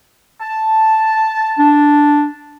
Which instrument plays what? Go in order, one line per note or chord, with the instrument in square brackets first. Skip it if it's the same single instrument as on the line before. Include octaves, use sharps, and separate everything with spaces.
[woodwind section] A5
[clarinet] D4